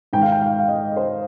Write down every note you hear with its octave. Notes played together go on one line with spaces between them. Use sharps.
G#2 D#3 G5
F5
G5
F5
F5
D#5
C5